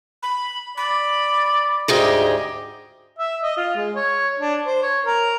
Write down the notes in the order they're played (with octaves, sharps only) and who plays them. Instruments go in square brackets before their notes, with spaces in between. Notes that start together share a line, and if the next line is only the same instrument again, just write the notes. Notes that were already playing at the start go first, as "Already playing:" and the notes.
[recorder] B5
[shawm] D5 [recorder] B5
[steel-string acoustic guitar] D2 G#2 G4 [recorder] G#4 [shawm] D#5
[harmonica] E5
D#5
F4
G#3
C#5
D4
C5
C#5
A#4